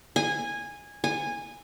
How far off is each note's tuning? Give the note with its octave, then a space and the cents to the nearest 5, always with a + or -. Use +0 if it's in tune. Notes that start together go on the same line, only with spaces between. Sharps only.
G#5 -15
G#5 -15